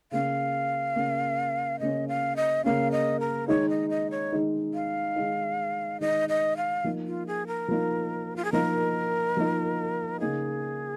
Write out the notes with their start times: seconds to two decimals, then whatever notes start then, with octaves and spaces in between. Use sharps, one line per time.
0.11 C#3 A#3 C#4 F5
0.96 C#3 A#3 C#4
1.80 C#3 A#3 C#4 D#5
2.08 F5
2.36 D#5
2.64 C#3 A#3 C#4 F5
2.92 D#5
3.20 A#4
3.48 D#3 G#3 D#4 C#5
3.69 D#5
3.90 D#5
4.11 C#5
4.32 D#3 G#3 D#4
4.74 F5
5.16 D#3 G#3 D#4
6.00 D#3 G#3 D#4 D#5
6.29 D#5
6.57 F5
6.84 F3 A#3 D#4
7.06 F4
7.27 G#4
7.47 A#4
7.68 F3 A#3 D#4
8.36 F4
8.45 G#4
8.52 F3 A#3 D#4 A#4
9.37 F3 A#3 D#4
10.20 C#3 A#3 D#4 G#4